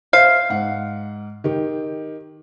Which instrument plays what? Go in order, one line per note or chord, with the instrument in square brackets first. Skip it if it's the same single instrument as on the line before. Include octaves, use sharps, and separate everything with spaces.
[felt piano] C5 E5 [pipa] F5
[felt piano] G#2 F#5
D#3 G4